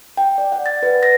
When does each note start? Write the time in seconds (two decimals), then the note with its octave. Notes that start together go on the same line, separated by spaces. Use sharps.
0.17 G5
0.38 D5
0.52 F#5
0.66 A6
0.83 B4
1.03 A#6